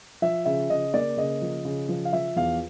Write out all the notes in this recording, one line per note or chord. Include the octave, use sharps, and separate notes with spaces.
F3 E5
C#3 E5
C#3 D#5
A#3 D5
C#3 D#5
F3
C#3
F3
F5
F3 E5
E2 F5